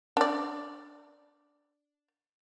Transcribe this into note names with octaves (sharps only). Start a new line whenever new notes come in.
D4 D5